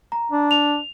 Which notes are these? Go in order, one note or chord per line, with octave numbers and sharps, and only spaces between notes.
A#5
D4
F7